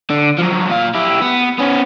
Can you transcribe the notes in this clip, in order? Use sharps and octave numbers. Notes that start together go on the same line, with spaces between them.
D3
F3 F#3
A#2 F5
E4 G4
B3
B3 C#4